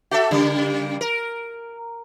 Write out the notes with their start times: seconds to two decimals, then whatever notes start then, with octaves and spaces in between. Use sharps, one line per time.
0.11 F#4 A4 E5
0.31 C#3 G3 A#3
1.01 A#4